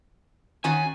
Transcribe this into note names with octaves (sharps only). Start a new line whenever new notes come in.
D#3 C#4 F#4 G#5